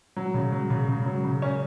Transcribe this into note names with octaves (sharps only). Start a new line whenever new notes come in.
F#3
C#3
F#3
C#3
C#3
F#3
C#3
C#4